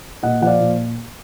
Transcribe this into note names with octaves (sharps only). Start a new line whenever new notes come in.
A#2 D#5 F#5
F3 F#5
D5 F5
A#2